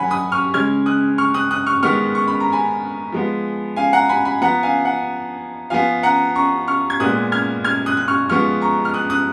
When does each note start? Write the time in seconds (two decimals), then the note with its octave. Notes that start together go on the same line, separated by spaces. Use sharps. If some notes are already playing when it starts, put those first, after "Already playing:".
Already playing: D#3 F#3 C#4 F#5 G#5 B5
0.10 B5 D#6
0.32 C#6 F6
0.54 C#3 G#3 C#4 F6 G#6
0.86 D#6 F#6
1.18 C#6 F6
1.34 D#6 F#6
1.51 D#6 F#6
1.67 C#6 F6
1.83 D#3 G#3 B3 C#6 F6
2.15 C#6
2.28 B5
2.40 A#5
2.52 G#5 B5
3.12 F3 G#3 B3
3.76 F5 G#5
3.93 F#5 A#5
4.09 G#5 B5
4.25 G#5 B5
4.42 F3 B3 F#5 A#5
4.63 F5 G#5
4.85 F#5
5.70 F3 B3 F5 G#5
6.03 F#5 A#5
6.35 A#5 C#6
6.68 C#6 F6
6.90 G#6
7.00 A#2 G#3 B3 D#6 F#6
7.32 F6 G#6
7.64 F6 G#6
7.86 D#6 F#6
7.97 F#6
8.08 C#6 F6
8.29 F3 G#3 B3 C#6 F6
8.62 A#5 C#6
8.85 F6
8.94 D#6 F#6
9.10 D#6 F#6